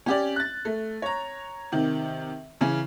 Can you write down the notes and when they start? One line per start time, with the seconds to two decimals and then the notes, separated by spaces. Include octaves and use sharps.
0.06 C#4 G4 D5
0.36 F#6 A6
0.65 A3
1.02 C#5 A#5
1.72 C3 D#3
2.61 C#3 E3 C#4